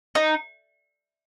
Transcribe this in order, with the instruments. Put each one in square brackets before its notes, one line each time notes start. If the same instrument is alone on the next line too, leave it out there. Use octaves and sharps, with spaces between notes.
[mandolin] D#4